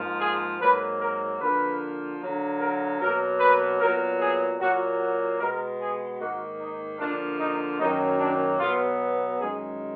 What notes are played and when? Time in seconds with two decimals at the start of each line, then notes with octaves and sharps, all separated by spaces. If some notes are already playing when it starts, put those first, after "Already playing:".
Already playing: G#2 F3 A#3
0.20 G#4
0.61 G#2 F#3 A#3 B4
1.00 A#4
1.40 D3 F3 A#3 B4
2.21 D3 F#3 A#3
2.60 A#4
3.01 B2 F#3 A#3 A#4
3.40 B4
3.80 A#2 F#3 B3 A#4
4.20 G#4
4.60 A#2 F#3 A#3 F#4
5.00 F#4
5.40 B2 G#3 B3 A#4
5.80 G#4
6.19 G#2 D#3 A#3 F#4
6.60 D#4
6.99 D3 F3 A#3 D4
7.39 D#4
7.79 F#2 D#3 F#3 A#3 D#4
8.20 D4
8.59 B2 F#3 B3 F4
9.39 F#2 D#3 G#3 G#4